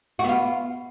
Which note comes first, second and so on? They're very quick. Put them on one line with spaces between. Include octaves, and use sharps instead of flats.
F#4 B3 F4